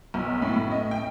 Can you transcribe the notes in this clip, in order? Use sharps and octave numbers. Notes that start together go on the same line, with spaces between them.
B1
A2
A2
D#5
G5